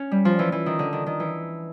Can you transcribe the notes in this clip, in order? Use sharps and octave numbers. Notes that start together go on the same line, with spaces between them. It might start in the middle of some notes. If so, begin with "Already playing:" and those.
Already playing: C#4
G3
F3
E3
E3
D#3
D3
D#3
D#3
E3